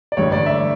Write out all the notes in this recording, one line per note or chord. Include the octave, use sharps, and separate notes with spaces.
D5
A1 G2 D3 C#5
D5
E5